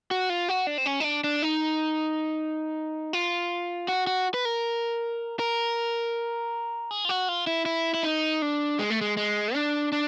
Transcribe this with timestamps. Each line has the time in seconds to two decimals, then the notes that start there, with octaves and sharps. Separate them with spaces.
0.11 F#4
0.30 F4
0.49 F#4
0.67 D4
0.78 C4
0.86 C#4
1.00 D#4
1.04 D4
1.24 D4
1.42 D#4
3.13 F4
3.88 F#4
4.07 F#4
4.34 B4
4.45 A#4
5.39 A#4
6.91 G#4
7.05 F4
7.09 F#4
7.29 F4
7.47 E4
7.66 E4
7.94 E4
8.03 D#4
8.42 D4
8.79 G#3
8.90 A3
9.01 G#3
9.17 G#3
9.55 D4
9.92 D4